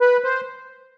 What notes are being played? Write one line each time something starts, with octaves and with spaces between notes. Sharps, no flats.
B4
C5